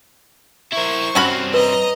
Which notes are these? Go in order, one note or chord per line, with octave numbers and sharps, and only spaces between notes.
E4 A#4 C5 C#6
G2 C4 C#4 F#4 B5
B4 D#5 A#5